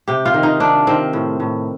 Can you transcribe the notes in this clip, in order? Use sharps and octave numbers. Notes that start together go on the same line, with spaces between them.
C3 G4
F4
D#3
D#4
C3 D4
D#3 C4
A2
A2